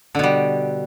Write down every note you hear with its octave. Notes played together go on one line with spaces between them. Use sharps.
B2 D3 G3